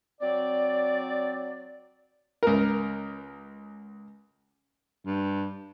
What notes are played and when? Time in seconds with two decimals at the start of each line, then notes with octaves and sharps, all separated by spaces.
0.21 F#3 C4 D5
2.43 C#2 A#4
5.05 G2